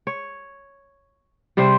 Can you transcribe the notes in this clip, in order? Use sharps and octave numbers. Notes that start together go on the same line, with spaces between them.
C#5
C3 G3 C4 C5